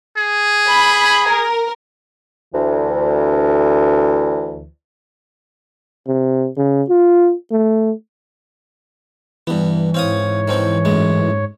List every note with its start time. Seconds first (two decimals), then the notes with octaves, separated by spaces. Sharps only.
0.17 G#4
0.68 B5
1.28 A#4
2.54 D2 E3
6.07 C3
6.57 C#3
6.89 F4
7.52 A3
9.47 G2 E3 B3
9.94 G#2 C4 C#5 F5 D#6
10.48 D#3 F3 C4
10.85 A1 F#2 G#3